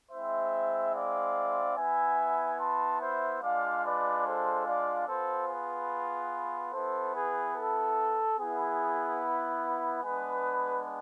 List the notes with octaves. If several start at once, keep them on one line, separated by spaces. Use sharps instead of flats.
G#3 C4 E4 C5 E5
D5 F5
B3 E4 E5 G#5
A5 C6
C5 E5
G#3 D4 F4 D5 F5
B4 D5
A4 C5
D5 F5
B3 F4 A4 C5
G#4 B4
B3 E4 A4 C5
G#4 B4
A4
B3 E4 G#4
G#3 B3 D4 G#4 B4